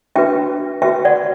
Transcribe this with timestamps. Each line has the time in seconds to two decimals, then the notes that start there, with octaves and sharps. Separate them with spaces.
0.16 D4 F#4 B4 E5 G5
0.82 F#4 B4 E5 G5
1.05 D5 F#5